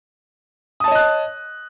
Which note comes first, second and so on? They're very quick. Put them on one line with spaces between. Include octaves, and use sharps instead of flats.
D#6 A5 C#5 D#5 F#6